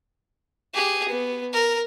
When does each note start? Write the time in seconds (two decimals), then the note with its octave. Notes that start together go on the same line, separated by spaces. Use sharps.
0.74 G4 G#4
1.09 B3
1.53 A#4